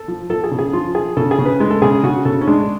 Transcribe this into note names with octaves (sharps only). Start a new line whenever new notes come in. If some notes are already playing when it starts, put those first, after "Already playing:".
Already playing: A4
F3
F3 A4
G#4
C#3
G#4
F3 F4
F3 G#4
C#3 A4
G#4
C#3
B4
G#3
A4
C#3 G#4
C#3 F#4
C#3 A4
C#4
G#3 D4